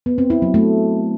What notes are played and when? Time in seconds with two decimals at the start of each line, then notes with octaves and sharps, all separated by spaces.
0.06 B3
0.18 C4
0.30 E4
0.42 F#3
0.54 A3